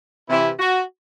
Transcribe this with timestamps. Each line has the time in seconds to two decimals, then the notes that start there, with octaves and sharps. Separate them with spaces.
0.28 C3 E3 E4
0.59 F#4